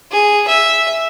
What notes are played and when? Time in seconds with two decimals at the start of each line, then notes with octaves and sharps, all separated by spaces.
0.11 G#4
0.47 E5